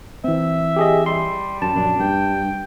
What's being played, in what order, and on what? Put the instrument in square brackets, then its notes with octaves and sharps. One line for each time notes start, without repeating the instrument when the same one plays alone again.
[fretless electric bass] E3 C4 [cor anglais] E5
[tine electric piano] G4 G#4 D#5
[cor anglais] G3 [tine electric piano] C6
[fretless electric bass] F#2 [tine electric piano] A5
[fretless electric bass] A#1 F#2 [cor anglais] D4
[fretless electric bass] G2 [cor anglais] G5